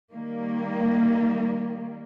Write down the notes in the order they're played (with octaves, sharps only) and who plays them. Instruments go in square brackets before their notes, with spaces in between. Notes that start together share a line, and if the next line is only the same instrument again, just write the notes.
[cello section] D#3 G3 A#3